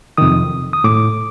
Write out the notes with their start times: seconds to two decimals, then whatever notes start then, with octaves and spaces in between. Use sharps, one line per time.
0.18 F2 C3 D#3 D#6
0.73 D#6
0.84 A2 D6